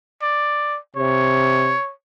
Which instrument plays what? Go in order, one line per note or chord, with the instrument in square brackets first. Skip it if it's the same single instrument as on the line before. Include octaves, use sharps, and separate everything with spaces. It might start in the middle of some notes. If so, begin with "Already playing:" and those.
[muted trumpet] D5
[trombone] C3 [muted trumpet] C#5